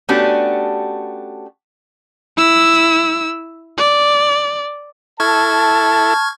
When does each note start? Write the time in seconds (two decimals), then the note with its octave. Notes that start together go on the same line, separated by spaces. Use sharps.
0.09 A3 B3 C#4 D4 F#4 G4
2.37 E4 E6
3.77 D5
5.20 E4 A4 A5 C#6 F6 G#6